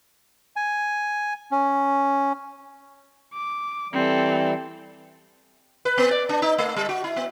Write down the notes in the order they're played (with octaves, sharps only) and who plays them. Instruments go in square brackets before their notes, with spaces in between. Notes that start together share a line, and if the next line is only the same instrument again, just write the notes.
[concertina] G#5
C#4
[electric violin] D6
[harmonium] E3 G3 [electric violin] C4 A4
[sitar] B4
B3
D5
D4
D#4
A3
G3
F#4
E4
B3